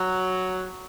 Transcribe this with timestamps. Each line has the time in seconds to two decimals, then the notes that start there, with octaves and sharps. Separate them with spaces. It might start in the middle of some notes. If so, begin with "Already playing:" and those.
Already playing: F#3